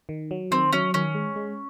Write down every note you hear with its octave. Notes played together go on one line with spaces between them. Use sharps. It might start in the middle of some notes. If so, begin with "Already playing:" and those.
D#3
F#3
D#3 C4
F#3 C#4
D#3 C#4
G#3
G#3